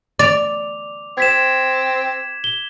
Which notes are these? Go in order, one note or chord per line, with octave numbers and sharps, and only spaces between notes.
D5 D6 F7
C4 G#6 B6 E7
G7